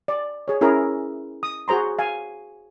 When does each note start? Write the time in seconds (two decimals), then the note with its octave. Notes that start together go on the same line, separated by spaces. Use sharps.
0.08 D5
0.48 G#4 C#5
0.61 C#4 E4 G#4 A#4
1.43 D#6
1.68 F#4 G#4 C5 A#5 C6
1.99 F5 G#5